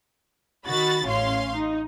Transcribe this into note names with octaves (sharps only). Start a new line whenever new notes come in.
D#3 F#4 B5 A6
A1 C#4 F5 C6
D#4